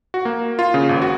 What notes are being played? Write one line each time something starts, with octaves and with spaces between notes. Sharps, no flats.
F#4
A#3
F4
C#3
G#1
F#4